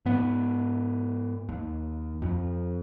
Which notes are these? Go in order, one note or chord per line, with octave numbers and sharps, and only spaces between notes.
G#2 B3
D#2
F2